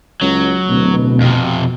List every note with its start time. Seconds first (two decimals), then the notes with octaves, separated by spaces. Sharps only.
0.21 C#2 F#3
0.69 D1 B2
1.21 F2 C3